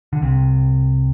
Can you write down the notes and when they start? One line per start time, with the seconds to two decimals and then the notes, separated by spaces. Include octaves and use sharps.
0.13 D3
0.22 C2 C3